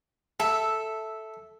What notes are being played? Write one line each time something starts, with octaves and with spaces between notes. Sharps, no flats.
A4 E5